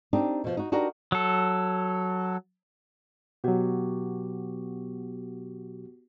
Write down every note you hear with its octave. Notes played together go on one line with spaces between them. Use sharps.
C4 D4 D#4 G4
B2 F3
D#4 F#4
D4 D#4 F#4 G4 A#4
F#3 A4
B2 F#3 B3 F#4 G4